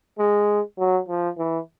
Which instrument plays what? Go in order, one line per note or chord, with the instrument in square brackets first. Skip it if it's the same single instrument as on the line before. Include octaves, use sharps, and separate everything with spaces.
[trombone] G#3
F#3
F3
E3